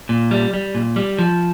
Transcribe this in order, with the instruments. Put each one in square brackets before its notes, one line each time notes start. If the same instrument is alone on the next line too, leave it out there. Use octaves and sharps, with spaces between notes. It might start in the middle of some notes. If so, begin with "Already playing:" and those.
[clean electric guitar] A#2
G3
G3
A#2
G3
F3